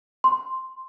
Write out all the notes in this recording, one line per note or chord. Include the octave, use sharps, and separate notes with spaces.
C6